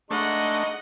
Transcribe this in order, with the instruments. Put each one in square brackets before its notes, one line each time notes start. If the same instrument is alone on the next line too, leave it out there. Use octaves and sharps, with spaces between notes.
[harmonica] G#3 D#4 C#6 [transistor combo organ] A3 D4 [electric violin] D#5 F#5